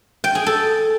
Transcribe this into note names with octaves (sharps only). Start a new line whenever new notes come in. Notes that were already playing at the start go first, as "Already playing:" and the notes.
G5
G#4
A4